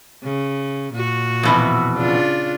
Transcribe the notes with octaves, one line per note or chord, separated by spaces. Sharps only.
C#3
A#2 F#4
F2 B2 E3
C#3 D4 F4